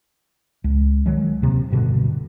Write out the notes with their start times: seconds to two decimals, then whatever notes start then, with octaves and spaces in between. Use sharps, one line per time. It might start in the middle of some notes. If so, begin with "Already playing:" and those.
0.64 C#2
1.06 D#3 F#3 G#3
1.42 D#2 C3
1.70 D1 G2 B2 D3